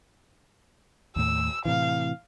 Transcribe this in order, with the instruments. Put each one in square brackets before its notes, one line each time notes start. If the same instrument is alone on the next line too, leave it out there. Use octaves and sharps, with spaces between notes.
[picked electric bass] D#2 A2 [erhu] E6
[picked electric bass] A2 C3 E3 [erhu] F5